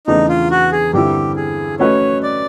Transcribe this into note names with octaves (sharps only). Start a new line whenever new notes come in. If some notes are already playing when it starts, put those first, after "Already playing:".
E2 C#3 E3 A3 D4 D#4
F4
F#4
G#4
G2 D3 G3 C4 E4 G4
G#4
A3 C#4 F#4 B4 C#5 D#5
D5